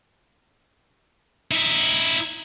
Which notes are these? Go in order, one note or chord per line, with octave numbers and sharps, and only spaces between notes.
D#4 E4